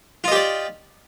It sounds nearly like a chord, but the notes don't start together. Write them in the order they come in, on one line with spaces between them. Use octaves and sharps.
F4 D#5 G4 D5